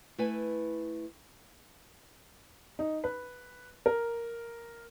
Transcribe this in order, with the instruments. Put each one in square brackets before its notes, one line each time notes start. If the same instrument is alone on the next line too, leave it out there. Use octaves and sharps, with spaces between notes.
[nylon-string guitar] A3 E4 B4 G#5
[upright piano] D#4
B4
A#4